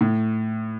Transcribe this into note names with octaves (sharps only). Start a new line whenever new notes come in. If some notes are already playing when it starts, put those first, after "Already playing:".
A2